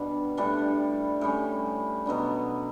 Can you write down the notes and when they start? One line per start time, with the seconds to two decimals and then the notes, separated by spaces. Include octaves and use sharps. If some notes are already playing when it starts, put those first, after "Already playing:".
Already playing: B2 G3 D4
0.37 A2 G3 D4
1.21 A2 G3 C#4
2.06 B2 F#3 B3 D4